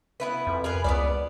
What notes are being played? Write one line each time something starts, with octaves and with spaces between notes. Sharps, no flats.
B3 E4 B4
F2
G#4 A#4 B4
C#2 B3 C4 D5